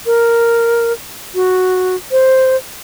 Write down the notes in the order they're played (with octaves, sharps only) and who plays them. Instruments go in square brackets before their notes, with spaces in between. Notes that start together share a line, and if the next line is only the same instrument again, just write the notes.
[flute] A#4
F#4
C5